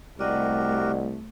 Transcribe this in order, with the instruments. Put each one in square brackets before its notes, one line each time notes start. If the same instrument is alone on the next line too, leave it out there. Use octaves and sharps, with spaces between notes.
[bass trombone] C2 [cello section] A3 [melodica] F#4 G4 A#4 [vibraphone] D5 D#5 F#5